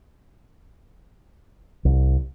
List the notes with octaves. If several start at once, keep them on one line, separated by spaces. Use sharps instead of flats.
C2